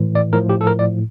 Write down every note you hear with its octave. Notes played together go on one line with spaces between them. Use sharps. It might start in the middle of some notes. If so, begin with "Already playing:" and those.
Already playing: A2 E3
D5
A2 F3 A#4
G4
A4
A#4
D5